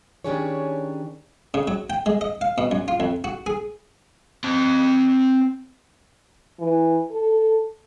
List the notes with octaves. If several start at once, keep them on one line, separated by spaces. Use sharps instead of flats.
D#3 C#4 D4 G4 G#4 C#5
C#3
F#3
G5
G#3
D#5
F5
B2
F#2
F4
F2
F#4
G#4
C4 A5
E3
A4